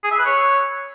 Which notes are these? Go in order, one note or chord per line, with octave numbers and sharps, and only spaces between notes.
G#4
E5
B4
C#5